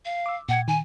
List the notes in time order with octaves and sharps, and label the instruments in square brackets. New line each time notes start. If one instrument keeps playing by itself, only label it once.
[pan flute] F5
[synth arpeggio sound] D6 E6
[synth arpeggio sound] A#2 G5 G#6 [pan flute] F#5
[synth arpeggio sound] D#3 [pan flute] G#5